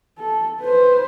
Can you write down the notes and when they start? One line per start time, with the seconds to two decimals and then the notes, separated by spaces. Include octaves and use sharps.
0.19 A4
0.62 B4 C5